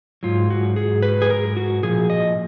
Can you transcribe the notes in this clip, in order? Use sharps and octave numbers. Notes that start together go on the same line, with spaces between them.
G#2 F#3 F4
F#4
G#4
B4
G#4
A#4
F#4
A#2 F3 G#4
D#5